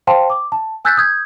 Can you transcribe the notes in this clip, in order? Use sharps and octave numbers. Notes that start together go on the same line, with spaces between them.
C5 F5 G5 A5 C6
D6
A5
G#5 E6 F#6 G6 A6 B6
D#6 G6 G#6